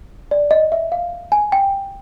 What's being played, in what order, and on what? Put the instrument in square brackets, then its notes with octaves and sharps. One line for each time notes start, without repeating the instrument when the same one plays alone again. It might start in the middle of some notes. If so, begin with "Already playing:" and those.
[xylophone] D5
D#5
E5
F5
G#5
G5